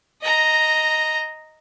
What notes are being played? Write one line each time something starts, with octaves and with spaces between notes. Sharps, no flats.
D#5 A#5